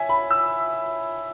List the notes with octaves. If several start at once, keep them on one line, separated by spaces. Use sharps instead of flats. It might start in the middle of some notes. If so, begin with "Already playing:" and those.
Already playing: C#5 E5 G#5
B5
E6